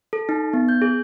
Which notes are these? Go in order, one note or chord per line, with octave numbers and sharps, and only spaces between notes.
A4
D#4
B3
G6
G#4